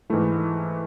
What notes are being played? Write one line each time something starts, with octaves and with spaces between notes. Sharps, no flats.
G#2 E3 A3 E4